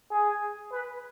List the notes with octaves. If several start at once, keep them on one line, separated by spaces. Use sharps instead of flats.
G#4
B4